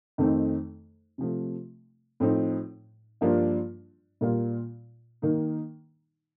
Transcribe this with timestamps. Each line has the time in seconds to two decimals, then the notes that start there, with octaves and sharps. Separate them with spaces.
0.18 F2 D#3 A3 C4 D#4
1.18 C3 F3 A3
2.20 A2 F3 C4 D#4
3.21 G2 F3 A#3 D4 F4
4.21 A#2 G3 A#3 F4
5.22 D#3 A#3 D#4